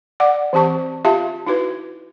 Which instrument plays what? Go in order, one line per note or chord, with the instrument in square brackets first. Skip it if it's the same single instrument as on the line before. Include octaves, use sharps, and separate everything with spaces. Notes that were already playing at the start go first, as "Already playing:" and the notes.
[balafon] D5 F#5 D6
E3 C4 G4 A5 C#6
F4 G4 E5 F5 A5
D#4 E4 F#4 B4